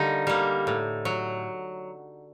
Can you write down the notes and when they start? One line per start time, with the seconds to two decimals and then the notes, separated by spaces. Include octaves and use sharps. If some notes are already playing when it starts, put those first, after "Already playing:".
Already playing: D3 G3 A#3 D#4
0.27 G3 A#3
0.67 A2
1.05 F#3